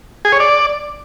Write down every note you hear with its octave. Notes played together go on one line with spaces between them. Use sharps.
G#4
C#5
D5